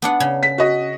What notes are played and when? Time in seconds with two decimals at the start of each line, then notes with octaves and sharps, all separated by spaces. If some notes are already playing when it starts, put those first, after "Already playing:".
0.02 B3 D4 F#5
0.20 C#3
0.43 B6
0.58 F#4 D#5